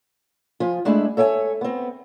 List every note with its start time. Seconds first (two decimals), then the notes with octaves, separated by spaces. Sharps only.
0.60 F3 F4 G#5
0.85 G#3 A3 D4 E4 G#4
1.17 A4 C#5 E5 G5 G#5
1.61 B3 C4